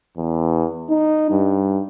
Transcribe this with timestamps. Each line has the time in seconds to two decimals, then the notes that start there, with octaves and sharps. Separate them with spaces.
0.17 E2
0.90 D#4
1.31 G2